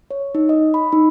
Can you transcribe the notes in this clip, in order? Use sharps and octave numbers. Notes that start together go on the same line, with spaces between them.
C#5
D#4
D#5
B5
D#4